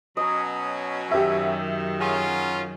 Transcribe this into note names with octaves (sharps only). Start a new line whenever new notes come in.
B2 F#3 C#4 D#5 A#5
F#2 D#3 G4 E5
F#3 C#4 F4 G#4